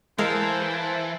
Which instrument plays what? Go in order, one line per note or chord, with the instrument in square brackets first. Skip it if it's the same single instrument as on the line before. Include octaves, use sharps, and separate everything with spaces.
[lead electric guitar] E3 [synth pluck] G#3 [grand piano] A#4 F5 E6 [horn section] C5 A5